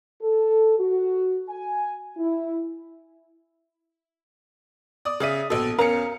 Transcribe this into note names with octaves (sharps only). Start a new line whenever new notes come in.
A4
F#4
G#5
E4
D5 D#6
C#3 G#4 D5 E5 D#7
A#1 B2 A4
E2 C#4 A#4 F5 A#5 C#7